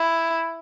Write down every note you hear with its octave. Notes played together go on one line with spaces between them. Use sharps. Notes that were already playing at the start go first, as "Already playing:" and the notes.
Already playing: E4